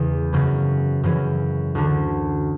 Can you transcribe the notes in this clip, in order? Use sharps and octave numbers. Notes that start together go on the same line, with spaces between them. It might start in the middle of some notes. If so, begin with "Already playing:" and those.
Already playing: E2 C#3 E3
F#2 C#3 E3
F#2 C#3 E3
D2 D3